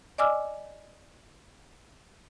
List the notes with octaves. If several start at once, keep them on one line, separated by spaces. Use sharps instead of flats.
D5 D#5 G#5 D6 E6 F6